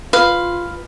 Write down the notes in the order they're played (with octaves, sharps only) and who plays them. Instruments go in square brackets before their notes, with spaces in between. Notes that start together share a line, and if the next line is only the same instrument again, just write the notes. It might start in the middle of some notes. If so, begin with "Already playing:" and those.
[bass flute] F4 [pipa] B4 [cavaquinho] F5